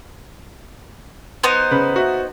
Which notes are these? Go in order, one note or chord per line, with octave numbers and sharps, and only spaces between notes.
B3 D#4 C5
C#3 B4
F#4 E5